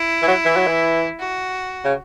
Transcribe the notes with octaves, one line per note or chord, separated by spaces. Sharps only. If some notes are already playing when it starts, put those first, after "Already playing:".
Already playing: E4
E3
F#3
E3
F#3
E3
F#4
C#3